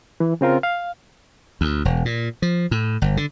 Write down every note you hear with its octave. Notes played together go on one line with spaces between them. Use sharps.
E3
C#3 C4 F4 A#4
F5
D2
E1
A#2
F3
A2
G1
D3